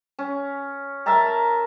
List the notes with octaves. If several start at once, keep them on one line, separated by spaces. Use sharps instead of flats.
C#4
A#4 E5 A5 A#5